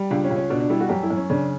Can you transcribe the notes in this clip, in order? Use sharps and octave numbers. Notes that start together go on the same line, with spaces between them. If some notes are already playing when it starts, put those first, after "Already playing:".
Already playing: G3
C#2 D4
C#4
C#2
C#4
B2 D4
D4
G3 E4
F#4
F#2 G4
E4
F#2
C#4
C#3 D4